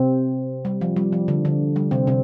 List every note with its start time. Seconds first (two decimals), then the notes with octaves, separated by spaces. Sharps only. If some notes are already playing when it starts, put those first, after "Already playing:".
Already playing: C3 C4
0.65 G3
0.81 F3
0.96 G3
1.13 F3
1.28 D3
1.45 D3
1.76 G3
1.91 C3 C4
2.07 C3 C4